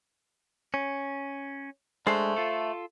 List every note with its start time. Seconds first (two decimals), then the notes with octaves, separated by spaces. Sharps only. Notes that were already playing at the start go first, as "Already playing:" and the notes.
0.74 C#4
2.07 G#3 A3 D4 C5
2.36 F4 A4